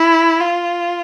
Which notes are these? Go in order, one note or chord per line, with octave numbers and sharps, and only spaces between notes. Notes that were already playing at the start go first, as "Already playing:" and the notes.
Already playing: E4
F4